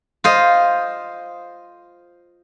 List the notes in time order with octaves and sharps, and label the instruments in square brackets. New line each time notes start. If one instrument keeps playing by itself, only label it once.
[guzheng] F4 C5 D#5